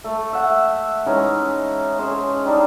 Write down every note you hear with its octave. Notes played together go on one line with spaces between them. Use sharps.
A3
E5 F#5
E3 G#3 C#4 D#4
C#4 G#4 C5
G3 D4 D#4